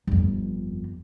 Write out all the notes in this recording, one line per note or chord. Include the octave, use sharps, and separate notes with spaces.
G1 F2